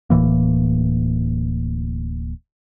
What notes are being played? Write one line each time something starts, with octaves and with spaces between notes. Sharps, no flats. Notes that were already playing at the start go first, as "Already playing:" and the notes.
D1 A2 E3 A#3